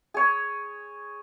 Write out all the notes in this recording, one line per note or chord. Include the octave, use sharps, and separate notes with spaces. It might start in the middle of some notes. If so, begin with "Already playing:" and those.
G#4 C#5